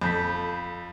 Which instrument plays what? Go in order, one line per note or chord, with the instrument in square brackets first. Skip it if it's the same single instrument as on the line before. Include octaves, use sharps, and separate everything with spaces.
[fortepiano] F2 A4 [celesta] B5 G6 B6